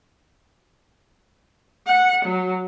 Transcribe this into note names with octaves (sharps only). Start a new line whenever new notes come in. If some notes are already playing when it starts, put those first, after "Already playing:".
F#5
F#3